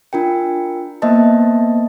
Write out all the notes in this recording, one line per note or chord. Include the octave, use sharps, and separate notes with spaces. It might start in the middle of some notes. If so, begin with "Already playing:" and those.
D4 F4 A#4 G5
A#3 B3 C5 D#5 E5 A5